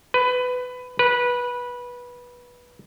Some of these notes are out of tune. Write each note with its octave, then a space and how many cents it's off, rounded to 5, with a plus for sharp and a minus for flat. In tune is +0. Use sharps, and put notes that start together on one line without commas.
B4 +20
B4 -15